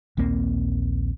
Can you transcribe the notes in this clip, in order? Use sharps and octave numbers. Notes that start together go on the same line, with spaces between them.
A#1 D#2 A#3 C4